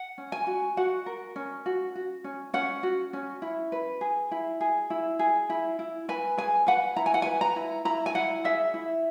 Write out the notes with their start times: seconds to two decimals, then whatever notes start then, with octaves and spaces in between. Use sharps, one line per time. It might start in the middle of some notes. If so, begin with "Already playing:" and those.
Already playing: F#5
0.18 C#4
0.32 G#5
0.47 F#4
0.77 F#4 F#5
1.06 A#4
1.36 C#4
1.66 F#4
1.95 F#4
2.24 C#4
2.54 C#4 F#5
2.83 F#4
3.13 C#4
3.42 E4
3.72 B4
4.01 G#4
4.31 E4
4.61 G#4
4.90 E4
5.19 G#4
5.50 E4
5.79 E4
6.09 B4 G#5
6.37 G#4 G#5
6.67 B4 F#5
6.96 E4 A#5
7.06 G#5
7.14 F#5
7.22 B4 G#5
7.41 A#5
7.56 E4
7.85 E4 A#5
8.06 G#5
8.15 E4 F#5
8.44 G#4 E5
8.74 E4